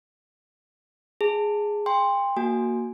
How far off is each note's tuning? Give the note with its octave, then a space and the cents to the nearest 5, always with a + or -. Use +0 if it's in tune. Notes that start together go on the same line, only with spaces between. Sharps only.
G#4 +0 A5 +20
G5 +35 C6 +0
A#3 +0 F#4 +0 G#5 +0